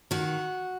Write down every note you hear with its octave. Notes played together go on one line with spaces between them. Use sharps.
D#3 F#4